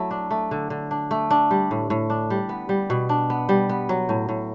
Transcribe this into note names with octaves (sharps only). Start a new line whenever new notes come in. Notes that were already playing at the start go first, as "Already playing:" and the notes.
Already playing: F#3 A3 E4
D4
A3
D3
D3
D4
A3
D4
G3
A2
A2
D4
G3
B3
G3
B2
D4
B3
G3
B3
F#3
A2
A2